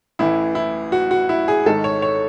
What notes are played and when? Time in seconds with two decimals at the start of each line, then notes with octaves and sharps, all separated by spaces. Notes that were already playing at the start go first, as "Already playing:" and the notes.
0.19 A1 A2 E3 E4
0.55 E4
0.92 F#4
1.11 F#4
1.29 E4
1.48 G#4
1.66 G#1 G#2 D#3 A4
1.84 C#5
2.02 C#5